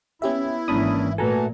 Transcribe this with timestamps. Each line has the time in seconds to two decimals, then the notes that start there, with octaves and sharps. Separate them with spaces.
0.22 B3 C#4 E4 G4 E5
0.68 G#1 E3 A#3 C#4 D4 A5 B5 D#6
1.18 A#2 E3 A3 F#4 A4 G#5 A#5